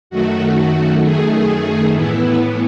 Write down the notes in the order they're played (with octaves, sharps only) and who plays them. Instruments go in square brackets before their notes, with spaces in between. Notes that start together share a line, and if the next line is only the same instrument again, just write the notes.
[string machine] F#2 D#3 A3 F#4
G#4
A2 E3 B3 E4